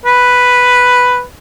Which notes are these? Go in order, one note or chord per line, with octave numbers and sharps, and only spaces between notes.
B4